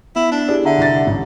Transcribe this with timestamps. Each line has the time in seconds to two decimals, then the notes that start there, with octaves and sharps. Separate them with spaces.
0.16 B3 E4
0.32 D4
0.48 E4 G4 G#4 D5
0.65 D3 E5 F#5 A#5
0.78 C2 D4 A6
1.07 A1